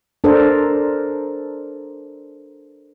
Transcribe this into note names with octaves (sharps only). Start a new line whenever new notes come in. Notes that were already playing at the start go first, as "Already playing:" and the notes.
D4 A4 A#4 C5